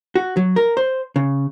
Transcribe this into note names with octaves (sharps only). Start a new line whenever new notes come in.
F#4
F#3
A#4
C5
C#3